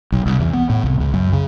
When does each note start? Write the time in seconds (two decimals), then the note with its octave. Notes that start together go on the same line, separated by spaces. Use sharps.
0.12 B1
0.26 C2
0.39 E2
0.54 B3
0.70 A2
0.84 C2
1.00 C#2
1.14 F#2
1.33 C#3